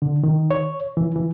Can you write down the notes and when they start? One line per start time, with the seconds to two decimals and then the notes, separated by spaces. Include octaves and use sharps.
0.02 D3
0.24 D#3
0.51 C#5
0.97 E3
1.15 E3